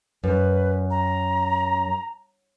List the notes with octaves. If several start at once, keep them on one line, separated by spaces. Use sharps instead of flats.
F#2 B4
A#5